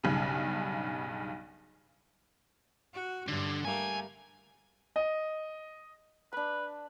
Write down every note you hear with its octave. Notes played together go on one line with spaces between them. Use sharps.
B1 G2 C#3
F#4
G2 D3
G3 A3 A#3 G#5
D#5
D4 B4 B5